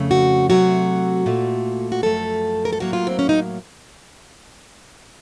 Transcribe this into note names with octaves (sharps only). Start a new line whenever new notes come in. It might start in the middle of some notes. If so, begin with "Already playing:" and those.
Already playing: F2 C#3 A3
F#4
C3 F#3 A3 F#4
A#2 A3
F#4
F#2 F3 A3 A4
A#4
A4
A2 F#3 A#3 F#4
F4
C4
C#4
D#4